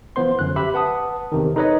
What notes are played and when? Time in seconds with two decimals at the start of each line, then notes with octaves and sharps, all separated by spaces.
0.16 E3 F3 B3 C5 C6
0.39 F#2 D3 F#6
0.56 G4 E5 B5
0.74 B4 F#5 A5 D#6
1.32 E2 C3 D#3
1.56 D#4 A4 B4 C#5 D#5